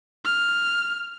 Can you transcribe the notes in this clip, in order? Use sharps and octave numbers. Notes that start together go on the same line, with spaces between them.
F6